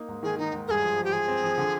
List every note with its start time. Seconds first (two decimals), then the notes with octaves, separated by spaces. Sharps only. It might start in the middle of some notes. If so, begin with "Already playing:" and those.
Already playing: A#3 D#4
0.08 G#2
0.23 D#3 G#4
0.38 D#3 D#4
0.53 G#2
0.68 G2 G#4 A#4
0.83 F3
0.98 F3
1.04 G4
1.13 F3 G#4
1.28 C4
1.44 F3
1.58 D3